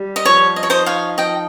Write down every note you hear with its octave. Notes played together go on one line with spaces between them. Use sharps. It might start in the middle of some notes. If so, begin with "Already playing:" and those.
Already playing: G3
D#5
F3 C#5
D#5
C#5
D#4 C5 D#5
C#5 F5
F3 D#5 G5